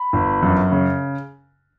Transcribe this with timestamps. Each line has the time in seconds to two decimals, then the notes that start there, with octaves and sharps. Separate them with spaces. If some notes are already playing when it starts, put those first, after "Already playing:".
Already playing: B5
0.13 G1
0.42 F#2
0.72 C#3